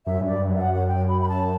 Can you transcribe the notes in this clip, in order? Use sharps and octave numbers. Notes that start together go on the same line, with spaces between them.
F#2 E5
G2
F#2 D5
G2
F#2
E5
F#5
F#5
G5
B5
B5
A5